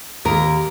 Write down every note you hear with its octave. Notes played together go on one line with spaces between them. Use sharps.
D#2 A#4